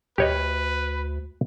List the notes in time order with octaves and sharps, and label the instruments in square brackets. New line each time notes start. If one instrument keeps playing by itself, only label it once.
[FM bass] D2 [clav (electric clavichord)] G4 C#5 D#5 [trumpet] B4